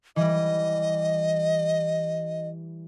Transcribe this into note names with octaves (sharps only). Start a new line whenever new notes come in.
E3 G3 D#5